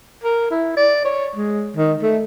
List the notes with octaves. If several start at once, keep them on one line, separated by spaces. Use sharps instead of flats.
A#4
E4
D5
C#5
G#3
D#3
A3